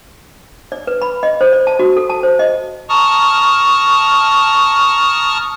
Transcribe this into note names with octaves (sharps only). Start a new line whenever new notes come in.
D5
B4
B5
D#5
C5
D5
A5
F#4
A4
A5
C5
D#5
A5 A#5 C#6 D#6 F6